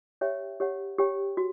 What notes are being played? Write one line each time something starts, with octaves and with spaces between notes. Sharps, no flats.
G4 C#5 E5 G5
G4 C#5 F#5
G4 C#5 G5
F#4